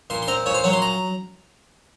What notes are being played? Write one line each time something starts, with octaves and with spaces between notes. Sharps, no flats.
A#2 C6
C6
C4 A#5
A#2 C#5
C5
F#3 C#5
C6
A#5